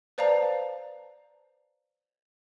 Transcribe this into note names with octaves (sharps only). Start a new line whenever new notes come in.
B4 C5 D5 F5 A5 A#5